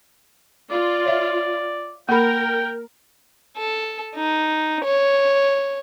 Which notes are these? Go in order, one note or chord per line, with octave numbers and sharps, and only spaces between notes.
F4 D5
C#5 E5
A#3 A#4 G5 B5
A4
D#4
C#5